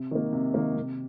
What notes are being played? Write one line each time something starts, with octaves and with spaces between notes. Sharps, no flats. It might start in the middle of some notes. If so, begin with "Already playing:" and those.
Already playing: C3
D#3 A#3
C3
D#3 A#3
C3